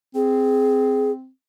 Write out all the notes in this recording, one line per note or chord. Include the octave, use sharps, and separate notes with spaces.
C4 G#4